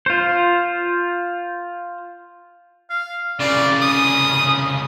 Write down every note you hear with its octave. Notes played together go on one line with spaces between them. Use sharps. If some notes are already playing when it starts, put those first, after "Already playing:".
F4 C5
F5
C2 C#3 D5
D#6